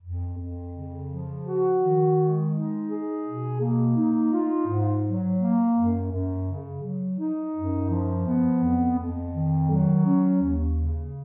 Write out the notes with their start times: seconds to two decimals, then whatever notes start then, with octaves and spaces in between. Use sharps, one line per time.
0.02 F2
0.38 F2
0.74 C#3
1.09 F3
1.45 F#4
1.81 D#3
2.17 G#3
2.53 D#4
2.89 G#4
3.25 B2
3.60 A#3
3.96 D#4
4.33 F4
4.68 G#2
5.04 F#3
5.40 A#3
5.76 F#2
6.11 F#2
6.47 C#3
6.83 F#3
7.19 D#4
7.55 F#2
7.90 F3
8.27 B3
8.63 F2
8.98 F2
9.34 D#3
9.70 F#3
10.06 C#4
10.41 D#2
10.77 C#3